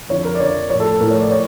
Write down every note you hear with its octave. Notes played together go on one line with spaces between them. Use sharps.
F2 D3 F3 C#5
A#4
D5
F2 D3 F3 C#5
A2 F3 C#5
A4
A2 F3 A#4
C#5
D5
C#5